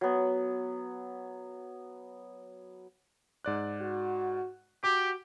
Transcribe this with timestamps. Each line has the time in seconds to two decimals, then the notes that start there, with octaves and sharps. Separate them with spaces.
0.01 F#3 B3
3.45 G#2 D5 F#6
3.81 F#4
4.84 F#4 G4 D6